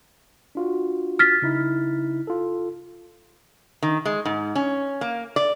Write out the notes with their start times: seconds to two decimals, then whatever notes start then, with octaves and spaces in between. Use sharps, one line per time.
0.55 D4 F4 F#4
1.19 F6 A6 B6
1.42 C#3 D#4 E4
2.27 F4 A4
3.83 D#3
4.05 G#3
4.25 G#2
4.55 C#4
5.01 A#3
5.36 D5